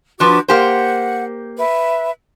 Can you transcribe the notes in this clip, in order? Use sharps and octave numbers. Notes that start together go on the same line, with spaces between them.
F3 D4 F#4 B4 D6
A#3 G4 C5 F#5
B4 E5